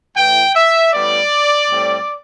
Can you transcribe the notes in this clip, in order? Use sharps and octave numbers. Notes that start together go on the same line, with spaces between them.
A2 E3 A3 G5
E5
A2 G3 B3 D5
A2 G3 C4